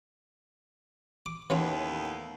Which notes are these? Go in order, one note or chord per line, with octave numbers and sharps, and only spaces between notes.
D6
D#2 A2 E3 B3 C#4 F4